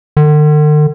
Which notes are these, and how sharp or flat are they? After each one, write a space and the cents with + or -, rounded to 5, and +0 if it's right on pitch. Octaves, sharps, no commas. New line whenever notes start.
D3 +45